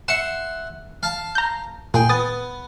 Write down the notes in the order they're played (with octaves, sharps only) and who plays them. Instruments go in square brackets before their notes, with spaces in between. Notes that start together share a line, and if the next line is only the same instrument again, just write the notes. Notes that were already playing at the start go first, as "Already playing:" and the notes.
[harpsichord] E5 F#5 C6 [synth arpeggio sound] C#7 E7
[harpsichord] F5 A5
[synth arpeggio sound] A#5 G6
[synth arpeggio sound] A#2 [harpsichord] G#4 G5
[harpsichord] B3 [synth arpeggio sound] D#6 A6